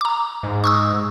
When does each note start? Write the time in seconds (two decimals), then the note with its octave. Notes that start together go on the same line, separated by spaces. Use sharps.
0.01 A#5 D6
0.43 G#2
0.64 C#6 D#6 E6